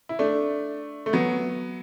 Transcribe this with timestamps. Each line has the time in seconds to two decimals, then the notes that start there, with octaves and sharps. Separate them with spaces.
0.09 E4
0.19 A3 D4
1.06 A3
1.13 F#3 B3